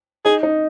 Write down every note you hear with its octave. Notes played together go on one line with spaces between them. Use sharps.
D#4 G#4
D#4